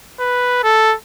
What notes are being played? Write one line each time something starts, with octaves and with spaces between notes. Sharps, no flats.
B4
A4